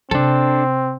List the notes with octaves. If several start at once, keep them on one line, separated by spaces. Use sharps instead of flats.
C3 C4 D4 A4